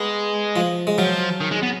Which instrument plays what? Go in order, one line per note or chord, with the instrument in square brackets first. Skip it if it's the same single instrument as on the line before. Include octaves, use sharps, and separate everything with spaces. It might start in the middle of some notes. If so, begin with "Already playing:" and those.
Already playing: [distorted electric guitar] G#3 [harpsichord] B3
[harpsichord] F3
G#3
[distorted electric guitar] F3 [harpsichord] F#3
[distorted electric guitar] D#3
G#3
B3